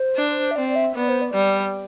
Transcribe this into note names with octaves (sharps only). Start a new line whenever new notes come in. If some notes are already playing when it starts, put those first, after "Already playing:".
Already playing: C5
D4
E5
C4 D5
E5
B3 D5
C5
D5
G3